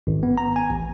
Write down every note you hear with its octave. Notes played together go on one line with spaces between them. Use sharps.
G#1
B3
A#5
G#5
A1